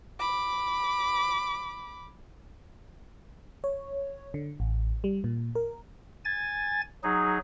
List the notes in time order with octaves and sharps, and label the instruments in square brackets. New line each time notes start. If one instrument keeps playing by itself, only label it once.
[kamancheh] B5 D6
[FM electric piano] C#5
D3
A1
G3
A#2
A#4
[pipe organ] G#5 A6
F#3 D#4 G#4